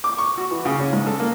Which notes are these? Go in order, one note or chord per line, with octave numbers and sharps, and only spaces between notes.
D6
C#6
F#4
E3
C#3
C#4
G#2
A4
A#3